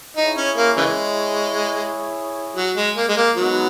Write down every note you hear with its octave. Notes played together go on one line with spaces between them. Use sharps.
D#4 E4 G#4 C#5
C#4
A#3
C#3 E3 G#3
F#3
G#3
A#3
G#3
A#3
F#3 G#3 B3 D#4